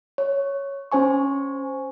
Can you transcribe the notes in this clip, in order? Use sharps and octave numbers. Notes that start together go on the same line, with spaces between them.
C#5
C#4 C5 G#5 C#6